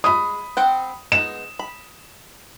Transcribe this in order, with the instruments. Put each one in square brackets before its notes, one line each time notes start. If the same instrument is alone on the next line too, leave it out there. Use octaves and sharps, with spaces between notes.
[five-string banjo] G#3 [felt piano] B5 D#6
[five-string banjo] C4 F#5 G5
[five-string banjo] G#3 B3 D#4 [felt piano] E7
[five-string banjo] B5